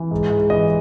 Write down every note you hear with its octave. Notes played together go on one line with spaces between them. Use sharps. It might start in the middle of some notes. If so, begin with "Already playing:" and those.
Already playing: E3
G#2
G#2
E3 D#5